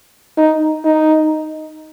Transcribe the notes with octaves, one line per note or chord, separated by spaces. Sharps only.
D#4
D#4